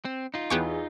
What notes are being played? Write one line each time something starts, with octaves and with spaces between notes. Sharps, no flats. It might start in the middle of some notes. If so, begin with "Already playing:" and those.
C4
D#4 F4
E2 E3 B3 G4 C#5